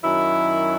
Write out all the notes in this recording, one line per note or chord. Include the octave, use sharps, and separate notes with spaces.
F#2 D#3 F#3 E4